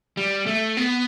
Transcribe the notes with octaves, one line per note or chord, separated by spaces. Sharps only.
G3
A3
B3